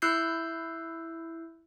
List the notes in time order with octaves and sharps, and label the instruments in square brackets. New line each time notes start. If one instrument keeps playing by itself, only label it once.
[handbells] E4 E6 F#6 G6 C7